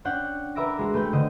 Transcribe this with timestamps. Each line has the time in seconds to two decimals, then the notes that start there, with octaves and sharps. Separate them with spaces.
0.05 C#4 D4 F#5 G5
0.55 A#4 B4 E5 D6 A#6
0.78 G#3 F#4
0.94 A3 B4 G5
1.12 D3 C5 D#5